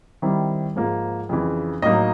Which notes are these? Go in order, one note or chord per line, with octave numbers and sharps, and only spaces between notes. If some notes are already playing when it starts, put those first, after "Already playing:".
D#3 G3 C4 E4
G#2 F3 A#3
F2 C#3 E3
A2 F#3 A#3 D#4 D#5